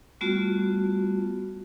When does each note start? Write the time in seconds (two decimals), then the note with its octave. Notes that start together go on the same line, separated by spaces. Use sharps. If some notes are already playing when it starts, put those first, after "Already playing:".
0.21 G3 A3 B3 F4 F#4